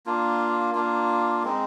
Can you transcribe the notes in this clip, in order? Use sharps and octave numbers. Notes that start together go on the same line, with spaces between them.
A#3 D4 F4
A#3 D4 F4
G#3 C4 D#4